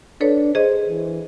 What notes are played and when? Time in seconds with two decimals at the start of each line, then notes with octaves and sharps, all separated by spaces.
0.21 D4 A4 B4 C#5
0.55 G#4 C5 D#5
0.89 E3